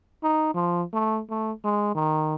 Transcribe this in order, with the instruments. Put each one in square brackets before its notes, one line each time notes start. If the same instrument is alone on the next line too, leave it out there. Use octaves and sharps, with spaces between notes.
[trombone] D#4
F3
A3
A3
G#3
D#3